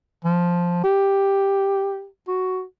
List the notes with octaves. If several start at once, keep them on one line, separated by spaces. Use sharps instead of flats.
F3
G4
F#4